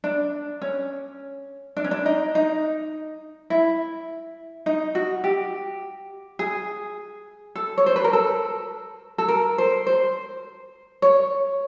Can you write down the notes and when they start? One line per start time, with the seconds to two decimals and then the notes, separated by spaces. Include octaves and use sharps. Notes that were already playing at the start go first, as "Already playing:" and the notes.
0.04 D4
0.62 C#4
1.77 D4
1.84 C#4
1.91 D4
2.06 D#4
2.35 D#4
3.50 E4
4.66 D#4
4.95 F#4
5.24 G4
6.39 G#4
7.55 A4
7.78 C#5
7.86 C5
7.96 B4
8.04 A#4
8.13 A4
9.18 A4
9.28 A#4
9.58 C5
9.87 C5
11.02 C#5